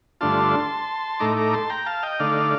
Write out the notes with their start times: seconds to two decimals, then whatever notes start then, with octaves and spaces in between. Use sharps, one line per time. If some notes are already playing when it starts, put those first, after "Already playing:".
0.21 G2 D3 A3 D4 F4 A5 C6
1.20 A2 A3 D#4 A#5 D6
1.37 A#5 D6
1.53 A5 C6
1.70 G5 A#5
1.86 F5 A5
2.03 D#5 G5
2.20 D3 A3 D#4 D5 F5